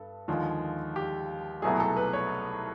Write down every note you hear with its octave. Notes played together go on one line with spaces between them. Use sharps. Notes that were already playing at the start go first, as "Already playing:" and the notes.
Already playing: G2 A4
D#2 D3 F3 G#3
G4
C2 B2 F#3 A3 G#4
A4
B4
C#5